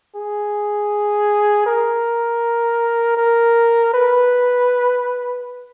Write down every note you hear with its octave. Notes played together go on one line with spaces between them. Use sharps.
G#4
A#4
A#4
B4